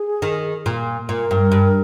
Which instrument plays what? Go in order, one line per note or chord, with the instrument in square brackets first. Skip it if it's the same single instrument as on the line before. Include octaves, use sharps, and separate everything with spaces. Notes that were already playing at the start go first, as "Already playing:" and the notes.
Already playing: [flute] G#4
[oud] D#3
A#2
[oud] A#2 [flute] A#4
[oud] G2
G2